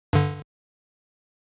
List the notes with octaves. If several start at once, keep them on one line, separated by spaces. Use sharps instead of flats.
G2 D3